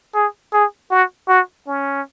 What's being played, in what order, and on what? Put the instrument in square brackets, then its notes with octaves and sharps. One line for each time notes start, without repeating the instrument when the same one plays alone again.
[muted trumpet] G#4
G#4
F#4
F#4
C#4